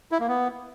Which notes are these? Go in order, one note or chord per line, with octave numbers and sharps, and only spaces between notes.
E4
A#3
B3